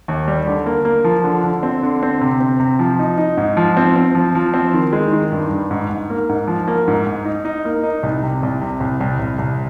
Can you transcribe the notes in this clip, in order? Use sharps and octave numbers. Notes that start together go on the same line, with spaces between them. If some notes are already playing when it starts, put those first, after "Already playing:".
D#2
G3
D3
A#3
A#3
F3
D3
D3
C4
D3
C4
C3
C4
C3
F3
D#4
D#4
G#2
F3
C4
C4
F3
F3
C4
D#3
G#3
D#3
G2
G2
G#2
G#2
A#3
G#2
F3
A#3
G#2
G#2
D#4
D#4
A#3
D#4
C2
C3
C2
C3
C2
C2
C2
C2